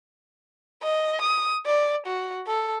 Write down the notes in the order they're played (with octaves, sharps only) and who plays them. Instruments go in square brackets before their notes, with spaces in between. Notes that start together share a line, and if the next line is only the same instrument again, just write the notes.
[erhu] D#5
D#6
D5
F#4
A4